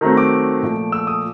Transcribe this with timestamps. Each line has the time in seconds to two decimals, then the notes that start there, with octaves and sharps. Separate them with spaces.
0.01 D#3 F#3 A3 C4 A#5
0.17 D6
0.63 A#2 F3 A3
0.92 E6
1.07 D#6